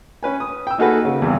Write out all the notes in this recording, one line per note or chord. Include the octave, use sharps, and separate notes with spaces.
C#4 B4 G#5
D#6
G5 E6
A#3 D#4 F#4 G#4 A4 B4
C#3
E2 G2 C3